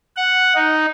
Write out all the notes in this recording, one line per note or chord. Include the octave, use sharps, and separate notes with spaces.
F#5
D#4